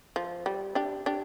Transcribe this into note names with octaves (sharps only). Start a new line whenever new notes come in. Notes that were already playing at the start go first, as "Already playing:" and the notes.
F3
G3
D4 G4
D4 G4